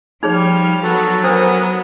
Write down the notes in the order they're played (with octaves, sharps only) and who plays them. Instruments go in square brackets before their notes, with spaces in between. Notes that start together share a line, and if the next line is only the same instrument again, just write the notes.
[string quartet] F3 G3 [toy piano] D#4 G#4 C#5 [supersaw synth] F6
[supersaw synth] F#3 [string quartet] B3 [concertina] F#4 A4
[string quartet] B3 [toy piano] D4 C5 [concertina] A#4 D#6